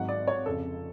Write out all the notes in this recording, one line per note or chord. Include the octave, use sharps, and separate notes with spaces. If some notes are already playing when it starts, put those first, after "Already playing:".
Already playing: G#1 G#2 F#3 F#5
D5
C#5
F1 F2 C#3 F3 A4